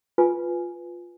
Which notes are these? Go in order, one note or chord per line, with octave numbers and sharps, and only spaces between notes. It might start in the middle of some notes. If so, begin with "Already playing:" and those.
F4 B4 G#5